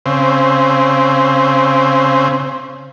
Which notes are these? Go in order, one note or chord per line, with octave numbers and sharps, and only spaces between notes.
C#3 C4